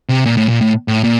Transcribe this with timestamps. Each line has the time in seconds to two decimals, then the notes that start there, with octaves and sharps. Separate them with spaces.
0.09 C3
0.25 A#2
0.37 A2
0.48 A#2
0.61 A2
0.88 A2
1.04 A#2